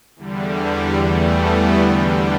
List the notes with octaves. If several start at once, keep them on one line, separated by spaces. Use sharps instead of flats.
E2 D3 G3
G3
E2 E3 G3 A3
G3 B3
E2 D3 G3